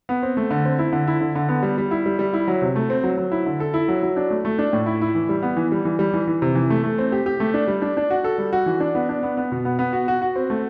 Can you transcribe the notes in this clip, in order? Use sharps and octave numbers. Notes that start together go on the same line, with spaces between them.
B3
C4
A3
D3
C4
E4
D3
E4
D3
D3
B3
G3
G3
E4
G3
G3
E4
F#3
C3
A3
C4
F#3
F#3
E4
D3
A4
E4
F#3
F#3
D4
A3
A3
D4
A2
E4
E4
E3
G3
B3
E3
G3
E3
G3
E3
E3
C3
E3
A3
A3
C4
G4
G4
A3
D4
G3
D4
D4
F#4
A4
G3
F#4
E3
D4
B3
D4
B3
B3
B2
B3
B3
F#4
F#4
F#4
C4
A3